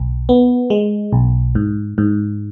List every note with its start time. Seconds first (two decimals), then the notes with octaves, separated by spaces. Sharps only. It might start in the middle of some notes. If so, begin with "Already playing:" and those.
Already playing: B1
0.29 B3
0.70 G#3
1.13 B1
1.55 G#2
1.98 G#2